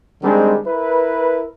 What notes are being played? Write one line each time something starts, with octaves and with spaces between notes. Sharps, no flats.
D#3 G3 G#3 C4 D4
E4 A#4 B4